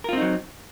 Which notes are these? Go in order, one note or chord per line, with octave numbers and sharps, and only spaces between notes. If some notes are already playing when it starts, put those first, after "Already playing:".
F#3 C4 D#4 F4 A#4